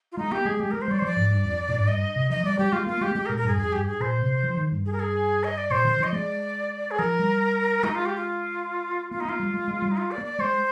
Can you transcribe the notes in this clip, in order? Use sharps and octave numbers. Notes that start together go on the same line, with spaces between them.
F4
G#3 D#4
A#3 G4
G#3 G#4
G#3 G4
G#3 A#4
C5
G3 D5
C5
F3 D5
G#2
G2
F2
A#2
G#2
G2 D#5
C3
F3 D#5
G3 D5
G3 G4
G#3 F4
A#3 F4
G#3 G4
A#3
G#3 G4
A#4
A#2
A#4
G2 G#4
F2 G#4
G2 G4
G#4
A#2 C5
C3
F3
D#3
G2
G#4
A#4
G#4
D#5
D5
A#2 C5
D3
F3 D#5
G#3 D5
G#4
F3 A#4
G3
G#3 D#4
F4
G4
F4
A#3 F4
D#4
A#3 F4
G3
G#3
G#3
G3
D#4
F4
D5
A#3
D5
G#3 C5